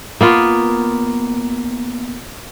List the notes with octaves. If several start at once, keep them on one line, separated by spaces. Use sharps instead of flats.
A#3 B3 F4